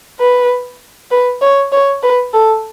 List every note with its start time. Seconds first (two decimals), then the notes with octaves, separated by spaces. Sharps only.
0.20 B4
1.11 B4
1.41 C#5
1.72 C#5
2.03 B4
2.33 A4